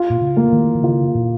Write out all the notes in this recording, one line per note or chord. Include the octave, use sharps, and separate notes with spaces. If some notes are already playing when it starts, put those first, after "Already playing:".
Already playing: F4
A#2
C#3
A#3
D#3
D#3
C#3 F4
A#2